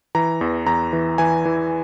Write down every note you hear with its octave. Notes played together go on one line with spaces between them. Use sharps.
E3 A#5
E2
E2 A#5
E3
E3 G#5
E3